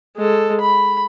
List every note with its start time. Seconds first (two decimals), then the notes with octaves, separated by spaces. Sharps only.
0.17 G#3 A4
0.61 B5